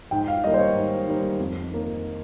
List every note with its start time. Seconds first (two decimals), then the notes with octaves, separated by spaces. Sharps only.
0.11 G#2 G5
0.28 F5
0.44 D#3 G3 A#3 D#5
0.54 C5
0.59 C#5
0.75 G#2
1.07 D#3 G3 A#3
1.40 F2
1.70 D#3 A#3